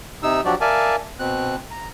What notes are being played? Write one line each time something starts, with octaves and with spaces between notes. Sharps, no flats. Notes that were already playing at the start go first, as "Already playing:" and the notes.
C3 D#4 E6
F3 F#3 D4 F#4 G4 D5
A#4 D5 E5 F5 G#5 A5
B2 C4 F#6
A#5